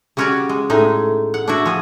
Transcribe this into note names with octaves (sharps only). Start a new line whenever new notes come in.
C#3 G3 C#4 F#4 C#5 D5
G#3
A2 G#3 D#4
F#5
D4 E4 F#4
F3 G#4